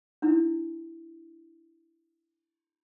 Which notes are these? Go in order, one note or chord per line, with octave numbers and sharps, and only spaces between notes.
D4 E4